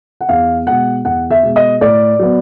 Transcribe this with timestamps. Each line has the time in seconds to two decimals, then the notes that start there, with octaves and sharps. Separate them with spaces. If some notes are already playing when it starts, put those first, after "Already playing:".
0.21 F#5
0.29 E2 F5
0.67 B2 G#3 F#5
1.05 E2 F#5
1.30 E5
1.43 B2 G#3
1.56 D#5
1.81 A2 D5
2.19 F#3 B3